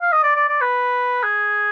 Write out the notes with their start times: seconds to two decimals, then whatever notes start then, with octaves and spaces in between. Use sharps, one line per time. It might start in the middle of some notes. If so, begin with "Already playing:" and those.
0.02 F5
0.12 D#5
0.23 D5
0.36 D5
0.49 D5
0.61 B4
1.23 G#4